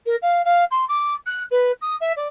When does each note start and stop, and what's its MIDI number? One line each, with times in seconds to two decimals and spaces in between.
0.05 0.15 70
0.22 0.41 77
0.44 0.64 77
0.70 0.85 84
0.88 1.14 86
1.26 1.43 90
1.50 1.71 71
1.81 1.96 87
2.00 2.12 76
2.16 2.27 74